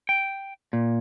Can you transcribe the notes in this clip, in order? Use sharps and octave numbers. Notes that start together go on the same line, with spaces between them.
G5
A#2